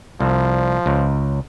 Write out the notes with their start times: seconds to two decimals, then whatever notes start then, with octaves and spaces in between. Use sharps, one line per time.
0.20 C2 F3
0.86 C#2